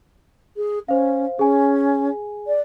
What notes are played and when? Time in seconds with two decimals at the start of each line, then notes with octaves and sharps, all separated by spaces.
0.57 G#4
0.88 C#4 C5 F5
1.39 C#4 G#4 G#5
2.47 D5